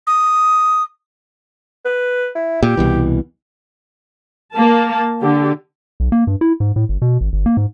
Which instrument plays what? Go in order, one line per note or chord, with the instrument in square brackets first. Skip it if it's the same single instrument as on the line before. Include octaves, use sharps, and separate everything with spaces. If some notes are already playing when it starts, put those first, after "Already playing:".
[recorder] D#6
[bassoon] B4
E4
[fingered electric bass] A#2 [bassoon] G4
[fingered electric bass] C2 B2 E3
[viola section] A#3 A5
D3 G4
[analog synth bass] B1
A#3
G2
E4
G#2
A2
G1
B2
G#1
G1
A#3
G#2